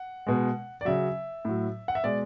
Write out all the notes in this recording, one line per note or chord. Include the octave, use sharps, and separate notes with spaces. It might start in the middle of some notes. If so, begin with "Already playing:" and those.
Already playing: F#5
B2 G#3
D5
C#3 F#3 E5
A2 F#3
F#5
E5
B2 G#3 D5